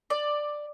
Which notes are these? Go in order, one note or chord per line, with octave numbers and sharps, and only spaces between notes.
D5